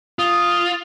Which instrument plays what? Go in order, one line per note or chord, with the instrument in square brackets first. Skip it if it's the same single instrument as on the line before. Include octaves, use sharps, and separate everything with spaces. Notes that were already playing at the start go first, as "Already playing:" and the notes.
[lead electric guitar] F4 [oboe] D#6